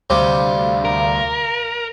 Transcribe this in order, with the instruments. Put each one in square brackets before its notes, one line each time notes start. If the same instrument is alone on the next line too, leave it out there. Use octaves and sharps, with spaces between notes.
[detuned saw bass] D2 [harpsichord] C3 G3 [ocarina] F5
[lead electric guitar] A#4